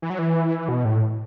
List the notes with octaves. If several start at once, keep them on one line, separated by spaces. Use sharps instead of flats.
E3
F#3
E3
B2
A2